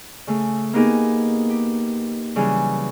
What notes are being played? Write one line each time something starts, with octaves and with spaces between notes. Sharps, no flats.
C#3 A3
A#3 B3 D#4 G4 G#4 A#4
G4
C#3 E3 F#3 G3 C#4